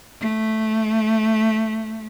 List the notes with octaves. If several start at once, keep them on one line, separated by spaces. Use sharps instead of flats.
A3